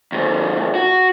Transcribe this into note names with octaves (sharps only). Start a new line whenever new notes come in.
D#2 G#2
F#4